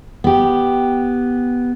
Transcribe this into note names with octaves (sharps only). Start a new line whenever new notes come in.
B3 G4